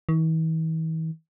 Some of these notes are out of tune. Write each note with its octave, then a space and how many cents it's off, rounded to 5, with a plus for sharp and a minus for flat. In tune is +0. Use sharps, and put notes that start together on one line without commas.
E3 -45